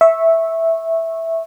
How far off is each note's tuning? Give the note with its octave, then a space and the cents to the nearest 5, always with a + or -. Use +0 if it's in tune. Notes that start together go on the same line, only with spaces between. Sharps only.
E5 -5 C#6 -15